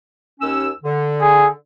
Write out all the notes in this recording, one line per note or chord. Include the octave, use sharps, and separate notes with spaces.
D#2 C#4 E6
D3
G#4